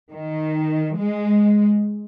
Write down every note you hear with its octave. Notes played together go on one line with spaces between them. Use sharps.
D#3
G#3